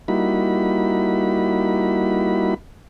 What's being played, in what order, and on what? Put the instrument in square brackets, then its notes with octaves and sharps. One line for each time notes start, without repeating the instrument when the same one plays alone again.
[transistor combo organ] G3 A#3 D#4 E4 F#4 B5